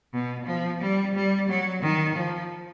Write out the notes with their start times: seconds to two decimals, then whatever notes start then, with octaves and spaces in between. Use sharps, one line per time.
0.13 B2
0.46 F3
0.81 G3
1.15 G3
1.49 F#3
1.82 D#3
2.16 F3